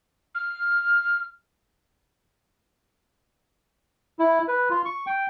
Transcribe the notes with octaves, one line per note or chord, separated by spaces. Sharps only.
F6
E4
B4
F4
C#6
G5